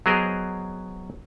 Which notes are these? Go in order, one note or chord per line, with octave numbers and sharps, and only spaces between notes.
F#3 B3 G#4 A#4 C5 D#5